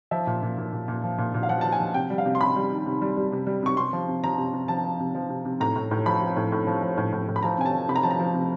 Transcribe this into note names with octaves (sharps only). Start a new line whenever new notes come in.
F3 E5
A#2
A#2
A#2
A#2
A#2
F3
A#2
A#2
F5
F3 F#5
F3 A5
G#5
F3
C3 G5
G3
F5
C3
C6
C3 B5
G3
D#3
C3
G3
G3
C3
G3
C3 C#6
C3 C6
F3
C3
F3 A#5
C3
C3
F3 A5
F3
C3
F3
C3
C3
A2 A#5
A2
A2
F3 B5
F3
A2
A2
F3
F3
A2
A2
A2
B5
F3 A#5
C3 G#5
A5
F3
C3 B5
A#5
F3 A5
A#5
F3
C3